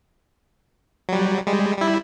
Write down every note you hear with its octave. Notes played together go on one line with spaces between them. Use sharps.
F#3 G3
G3 G#3
G3 E4